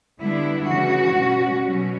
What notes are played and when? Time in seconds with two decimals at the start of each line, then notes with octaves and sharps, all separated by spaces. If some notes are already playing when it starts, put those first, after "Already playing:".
0.20 D3 G3 B3 D4 E4
0.67 C#3 E3 A3 C#4 F#4
1.14 B2 G3 C#4
1.61 B2 F#3 C#4